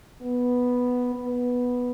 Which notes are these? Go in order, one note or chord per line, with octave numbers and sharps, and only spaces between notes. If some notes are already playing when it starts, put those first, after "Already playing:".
B3
B3